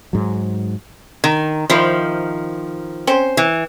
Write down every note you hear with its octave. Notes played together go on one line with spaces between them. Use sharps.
G#2 F#3
D#3
D#3 F3 E4 C5
C4 C#4 C5
E3